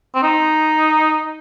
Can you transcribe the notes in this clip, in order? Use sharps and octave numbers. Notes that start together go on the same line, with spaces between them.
C4
D#4